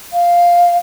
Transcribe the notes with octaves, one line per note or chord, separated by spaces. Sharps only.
F5